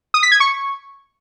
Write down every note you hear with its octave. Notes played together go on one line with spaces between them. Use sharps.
D#6
B6
G#6
C#6